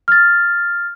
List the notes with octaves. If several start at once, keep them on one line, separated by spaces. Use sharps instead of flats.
F6 A6